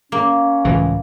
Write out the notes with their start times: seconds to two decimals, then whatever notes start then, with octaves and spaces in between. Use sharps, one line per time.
0.12 A#3 C#4
0.65 C#2 A2 E3